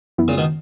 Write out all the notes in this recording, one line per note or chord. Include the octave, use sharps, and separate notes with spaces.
F#2 E3 B3 E4
A#2 C#3
B2 D#3